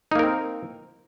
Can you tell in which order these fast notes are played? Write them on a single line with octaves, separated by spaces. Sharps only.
D#4 A#3 A#4 C4